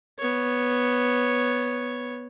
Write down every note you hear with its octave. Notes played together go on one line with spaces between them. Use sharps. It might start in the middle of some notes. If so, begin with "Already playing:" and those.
B3 C#5